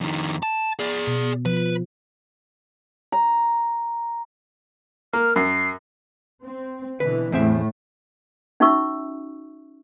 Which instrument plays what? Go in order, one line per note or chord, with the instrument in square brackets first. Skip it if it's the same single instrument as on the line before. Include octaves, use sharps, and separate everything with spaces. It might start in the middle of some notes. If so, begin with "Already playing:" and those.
[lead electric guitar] F2 D#3
A5
G#4 D5
[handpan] B2
[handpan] F3 [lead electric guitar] B4
[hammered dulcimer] A#5
[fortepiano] A#3 [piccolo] F6
[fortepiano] F#2 [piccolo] C7
[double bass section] C4
[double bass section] B2 D3 E3 [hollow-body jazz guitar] B4
[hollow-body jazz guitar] E2 C4 E5 [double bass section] A2 A3
[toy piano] C#4 D#4 F#4 E5 C#6 E6